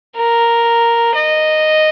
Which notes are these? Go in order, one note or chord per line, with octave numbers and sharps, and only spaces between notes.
A#4
D#5